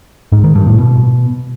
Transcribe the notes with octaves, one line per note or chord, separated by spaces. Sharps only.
G#2
D#3
G2
A2
B2